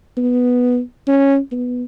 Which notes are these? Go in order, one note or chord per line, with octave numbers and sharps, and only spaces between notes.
B3
C#4
B3